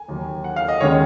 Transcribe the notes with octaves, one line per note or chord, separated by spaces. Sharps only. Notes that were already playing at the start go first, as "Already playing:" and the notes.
Already playing: G#5
D#2 D#3 F#3
F#5
F5
D#5
D#2 D#3 G#3 C#4 C#5